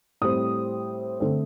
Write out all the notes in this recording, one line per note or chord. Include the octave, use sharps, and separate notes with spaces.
A2 G3 C4 D#6
D3 A3 C4